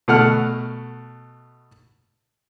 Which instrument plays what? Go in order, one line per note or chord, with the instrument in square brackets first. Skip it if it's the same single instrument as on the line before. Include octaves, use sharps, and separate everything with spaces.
[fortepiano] B2 A3 F#5 F6